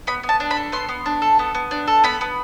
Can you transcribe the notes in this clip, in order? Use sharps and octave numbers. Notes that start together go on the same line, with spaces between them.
B3 B5
B3
A5
D4
B5
A4
B3 C6
B3
D4
A4
B3
B3
D4
A4
B3 B5
B3